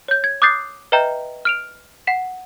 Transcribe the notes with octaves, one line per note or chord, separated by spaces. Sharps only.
C#5 G6
G#6
D6 D#6 F#6 G6 A6 C7
B4 D#5 E5 G5 A#5 G6
F6 D7 F7
F#5 B6 E7